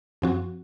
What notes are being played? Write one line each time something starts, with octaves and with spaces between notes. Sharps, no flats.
F#2 F3 C4 F#4